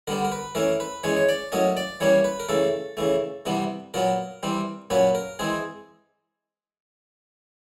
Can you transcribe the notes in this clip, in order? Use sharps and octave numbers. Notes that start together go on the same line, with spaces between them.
D3 G3 B3 A#4
A#4
B4
E3 A3 C#4 A#4
B4
E3 G#3 C#4 C#5
C#5
D5
A2 F#3 A#3 C#4 D#5
D5
E3 G3 A#3 C#4 C#5
B4
A#4
C#3 E3 A3 A4
C#3 E3 A3
C3 E3 G3 B3
A#2 F#3 B3 A#4
E3 G3 C4
A#2 F#3 A#3 C#4 B4
A#4
E3 G#3 C4 G#4